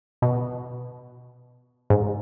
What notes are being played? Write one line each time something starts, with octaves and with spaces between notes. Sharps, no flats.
B2
G#2